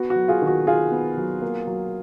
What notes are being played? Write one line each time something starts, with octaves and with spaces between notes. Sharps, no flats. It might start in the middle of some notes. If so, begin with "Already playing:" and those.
Already playing: B3 F#4
F#4
F#3
F4 G#4
D#3
F#4
D#3 F4 G#4
B3
F#3
A#3
F#3